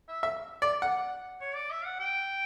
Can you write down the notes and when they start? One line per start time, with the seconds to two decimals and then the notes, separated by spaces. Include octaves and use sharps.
0.08 E5
0.23 E5
0.62 D5
0.82 F#5
1.41 C#5
1.56 D5
1.71 E5
1.85 F#5
2.00 G5